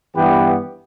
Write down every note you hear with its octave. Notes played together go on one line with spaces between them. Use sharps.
G2 E3 B3 G4 B4